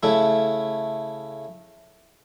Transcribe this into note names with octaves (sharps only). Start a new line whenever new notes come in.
C#3 A3 E4